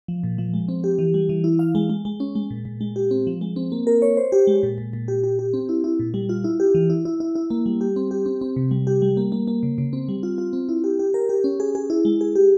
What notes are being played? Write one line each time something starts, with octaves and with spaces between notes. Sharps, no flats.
F3
A#2
F3
G#3
C4
G4
E3
G3
E3
E4
F5
G#3
G#3
G#3
C#4
G#3
A#2
A#2
G#3
G4
C4
F3
G#3
C4
A#3
A#4
C#5
C5
G4
G#3
A#2
A#2
A#2
G4
G4
G4
C4
E4
E4
A#2
G3
F4
E4
G4
E3
E4
E4
E4
E4
A#3
G3
G4
C4
G4
C4
C4
C3
G3
G4
G3
A#3
A#3
A#3
C#3
C#3
C4
G3
F4
F4
C4
E4
G4
G4
A#4
G4
C#4
G#4
G#4
E4
G#3
G#4
G4